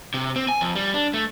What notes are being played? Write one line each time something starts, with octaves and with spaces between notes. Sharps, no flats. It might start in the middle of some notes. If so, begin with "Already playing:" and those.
C3
C4
G#5
F2
G3
D4
A3